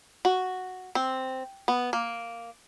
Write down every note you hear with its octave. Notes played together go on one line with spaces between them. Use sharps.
F#4
C4
B3
A#3